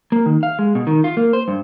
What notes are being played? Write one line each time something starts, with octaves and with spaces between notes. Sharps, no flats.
A#3
D#3
F5
G#3
B2
D#3
F4
A#3
C5
G2